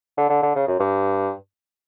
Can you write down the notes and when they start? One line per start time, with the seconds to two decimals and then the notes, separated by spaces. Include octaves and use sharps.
0.17 D3
0.30 D3
0.43 D3
0.55 C#3
0.67 F#2
0.80 G2